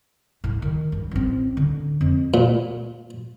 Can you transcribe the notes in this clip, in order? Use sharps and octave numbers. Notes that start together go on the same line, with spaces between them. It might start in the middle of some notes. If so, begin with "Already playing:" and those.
A2
D#3
G2
A1 C4
D3
F2
A#2